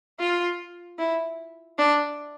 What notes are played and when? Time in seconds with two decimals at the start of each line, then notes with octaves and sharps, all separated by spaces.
0.20 F4
0.99 E4
1.78 D4